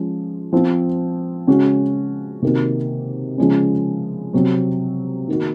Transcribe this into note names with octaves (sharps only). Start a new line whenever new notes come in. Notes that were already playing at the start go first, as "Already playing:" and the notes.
Already playing: F3 G#3 C#4
F3 C4 F4
C#3 G#3 C#4 F#4
C3 D#3 A#3 D#4 F#4
C#3 F3 G#3 C#4
C3 F#3 C4
D#3 A#3 D#4 F#4